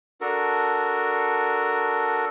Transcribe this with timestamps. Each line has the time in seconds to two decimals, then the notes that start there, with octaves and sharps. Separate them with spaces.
0.21 D4 F#4 A4 A#4